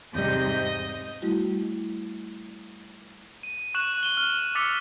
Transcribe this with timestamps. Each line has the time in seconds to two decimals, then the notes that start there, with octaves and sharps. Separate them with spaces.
0.15 E2 G#2 C3 G3 D#5 G6
1.22 G3 A3 E4 F#4
3.43 D#7
3.74 C#6 F#6 D#7 E7 F#7
4.03 D#7 E7 G7
4.17 F6
4.55 D6 E6 A6 B6 C#7 F7